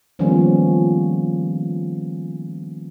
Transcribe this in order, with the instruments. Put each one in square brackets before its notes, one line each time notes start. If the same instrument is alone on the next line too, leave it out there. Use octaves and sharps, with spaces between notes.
[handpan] D#3 F3 G3 A#3 B3 C#4